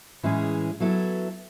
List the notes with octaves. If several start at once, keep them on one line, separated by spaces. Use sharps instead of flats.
A2 E3 G#3 C#4 G#4
F#3 B3 E4 A4